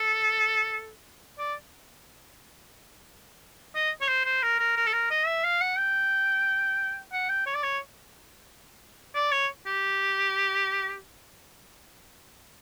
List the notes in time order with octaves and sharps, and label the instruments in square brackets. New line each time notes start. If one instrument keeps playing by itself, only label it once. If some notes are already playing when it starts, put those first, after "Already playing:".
Already playing: [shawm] A4
D5
D#5
C#5
C5
C5
A#4
A#4
A#4
A4
A#4
D#5
E5
F5
F#5
G5
F#5
G5
C#5
D5
C#5
D5
C#5
G4